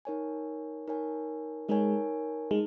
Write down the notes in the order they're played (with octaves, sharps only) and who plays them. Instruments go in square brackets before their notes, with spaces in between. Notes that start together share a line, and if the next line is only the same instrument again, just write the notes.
[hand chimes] D#4 A#4 C#5 G#5
D#4 A#4 C#5 G#5
[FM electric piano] G#3 [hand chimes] D#4 A#4 C#5 G#5
[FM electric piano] G#3 [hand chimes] D#4